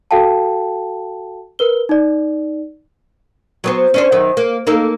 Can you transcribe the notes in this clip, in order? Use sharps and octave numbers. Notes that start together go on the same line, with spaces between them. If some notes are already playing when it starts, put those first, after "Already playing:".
F#4 A4 F5 G5 A5
A#4 B4 G7
D#4 D5
F#3 B3 C5
C#4 D4 C5
F#2 D#3
A#3
A#3 D#4 A4